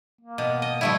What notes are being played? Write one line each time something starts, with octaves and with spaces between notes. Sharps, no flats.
A#3
B2
D#5
F3 G3 A3 E4